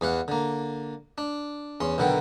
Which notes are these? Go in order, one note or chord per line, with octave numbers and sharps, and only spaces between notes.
E2 E3 F5 F#5
D3 A#3
D4
E2 C#4 C6
B1 B2 D3 D#3 B3 G5